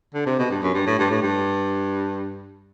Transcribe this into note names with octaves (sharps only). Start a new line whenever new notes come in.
D3
C3
B2
G2
F#2
G2
A2
G2
A2
G2